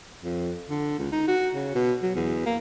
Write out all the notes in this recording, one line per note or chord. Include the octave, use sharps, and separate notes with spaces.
F2
D3
C#2
D#4
F#4
C#3
B2
F#3
E2
A#3